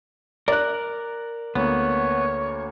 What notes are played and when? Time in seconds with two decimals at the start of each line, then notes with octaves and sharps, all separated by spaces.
0.48 A#4 D5 F#6
1.55 D2 A#3 B3 C#5